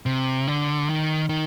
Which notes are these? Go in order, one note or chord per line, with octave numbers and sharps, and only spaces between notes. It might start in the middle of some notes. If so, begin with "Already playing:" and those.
C3
D3
D#3
D#3